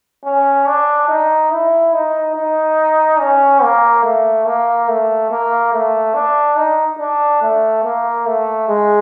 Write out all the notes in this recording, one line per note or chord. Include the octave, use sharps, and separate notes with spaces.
C#4
D4
D#4
E4
D#4
D#4
C#4
A#3
A3
A#3
A3
A#3
A3
D4
D#4
D4
A3
A#3
A3
G#3